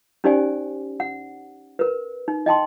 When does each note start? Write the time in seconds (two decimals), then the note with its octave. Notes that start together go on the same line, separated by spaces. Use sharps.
0.24 C#4 D#4 G4 C5 D5 G#5
1.00 F#5
1.79 A#4 B4
2.28 D#4
2.46 D#5 G5 A5 C6